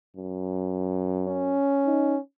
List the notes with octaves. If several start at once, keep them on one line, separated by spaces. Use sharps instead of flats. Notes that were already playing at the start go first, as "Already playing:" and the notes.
F#2
C#4
D#4